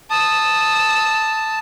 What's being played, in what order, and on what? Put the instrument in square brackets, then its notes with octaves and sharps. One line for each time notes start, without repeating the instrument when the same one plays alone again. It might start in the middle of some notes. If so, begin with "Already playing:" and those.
[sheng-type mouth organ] A5 [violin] D#6 E6